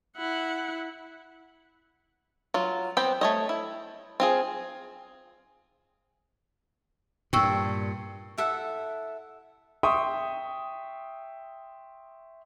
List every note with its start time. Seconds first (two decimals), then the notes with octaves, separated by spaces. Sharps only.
0.17 E4 F#5
2.54 F#3 F4
2.97 B3 C4 G5 B5
3.21 A3 C#5 D#5
3.49 E4
4.20 C4 F4 G#4
7.33 G2 A#2 G5 C#6 E6
8.38 E4 A4 E5 F#5
9.83 E5 G5 C6 C#6 D#6